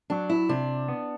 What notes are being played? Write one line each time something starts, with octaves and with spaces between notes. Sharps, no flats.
F#3 D4
E4
C3 D4
B3